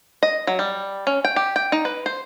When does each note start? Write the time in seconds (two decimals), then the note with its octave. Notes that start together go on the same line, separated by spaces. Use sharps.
0.23 D#5
0.47 F#3
0.59 G3
1.07 C#4
1.25 G5
1.36 G4
1.56 G5
1.72 D#4
1.85 B4
2.06 C5